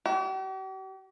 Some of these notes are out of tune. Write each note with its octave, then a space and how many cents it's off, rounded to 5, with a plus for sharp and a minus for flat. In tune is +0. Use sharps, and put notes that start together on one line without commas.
G4 -45